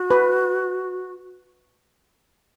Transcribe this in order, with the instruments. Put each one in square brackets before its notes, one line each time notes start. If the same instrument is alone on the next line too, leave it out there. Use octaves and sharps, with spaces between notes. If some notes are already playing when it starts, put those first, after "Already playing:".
Already playing: [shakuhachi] F#4
[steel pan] B4